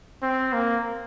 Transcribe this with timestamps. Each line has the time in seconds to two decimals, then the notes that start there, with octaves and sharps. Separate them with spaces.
0.22 C4
0.53 A#3